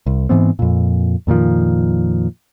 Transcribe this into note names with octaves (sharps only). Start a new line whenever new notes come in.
C2
G#2 E3 B3 C4
F2 A#2
F2 A#2 D#3 F3